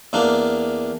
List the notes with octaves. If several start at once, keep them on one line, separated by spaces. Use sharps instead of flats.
E2 A#3 D4